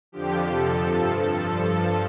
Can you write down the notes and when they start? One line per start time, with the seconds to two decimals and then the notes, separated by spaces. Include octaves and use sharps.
0.12 F2 D3 F3 G4
0.48 F2 C3 F3 A4
0.83 G2 F3